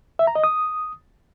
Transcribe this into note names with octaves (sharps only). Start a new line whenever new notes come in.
E5
A#5
D#5
D#6